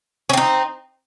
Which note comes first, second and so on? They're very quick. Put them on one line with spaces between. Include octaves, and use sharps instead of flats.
C#4 C4 D#4